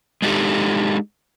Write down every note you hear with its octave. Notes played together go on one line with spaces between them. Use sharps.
G#3 D4 D#4 G4 A4